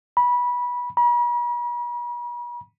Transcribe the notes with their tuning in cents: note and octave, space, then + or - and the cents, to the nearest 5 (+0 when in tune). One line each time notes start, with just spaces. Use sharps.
B5 -20
B5 -45